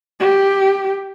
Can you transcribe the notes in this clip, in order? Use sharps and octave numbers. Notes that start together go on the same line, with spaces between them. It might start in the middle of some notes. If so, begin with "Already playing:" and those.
G4